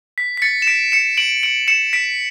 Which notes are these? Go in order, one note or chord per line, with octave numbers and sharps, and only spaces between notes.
B6
B6
A6 C#7
E7
B6 D7
C#7 E7
D7 F#7
D7 F#7
C#7 E7
B6 D7